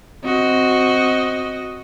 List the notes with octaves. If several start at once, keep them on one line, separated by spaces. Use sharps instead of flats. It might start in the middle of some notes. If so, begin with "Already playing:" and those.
C4 F#4 D#5